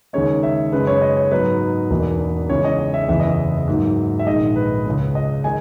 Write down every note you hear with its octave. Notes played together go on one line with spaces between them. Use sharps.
D#2 C#3 G#3 D#4 C#5
E5
F#2 C#3 G#3 B4
C#5
D#5
C#5
G#2 F#3 B3 D#4 B4
E1 E2 B2 A#3 D#4
E2 C#3 E3 G#3 C#5
D#5
D#5
E5
F#1 E2 C#3 E3 B3 E5
D#5
E5
G#2 F#3 A#3
E5
A#1 G#2 D#3 G#3 D#5
B4
C#2 C#3 G#3 C#4
D#5
D#3 G#3 D#4 G#5